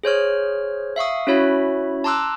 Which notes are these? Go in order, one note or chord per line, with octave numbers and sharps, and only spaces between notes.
G#4 C5 C#5 F6
E5 F5 C#6 D#6
C#4 E4 F#4 C#5 E5 B5
A5 A#5 C6 D6 E6 F#6